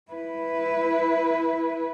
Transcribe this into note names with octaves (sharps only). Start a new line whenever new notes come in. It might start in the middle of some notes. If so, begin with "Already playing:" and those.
E4 B4